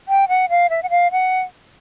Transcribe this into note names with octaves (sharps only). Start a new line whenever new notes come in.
G5
F#5
F5
E5
F#5
F5
F#5